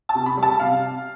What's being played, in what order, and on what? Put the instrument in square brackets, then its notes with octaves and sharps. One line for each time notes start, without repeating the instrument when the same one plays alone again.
[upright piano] A5
C3
B5
G3
A5
C3 F5